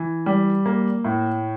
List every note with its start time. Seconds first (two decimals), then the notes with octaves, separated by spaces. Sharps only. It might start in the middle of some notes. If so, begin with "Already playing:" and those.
Already playing: E3
0.26 G3
0.66 A#3
1.04 A2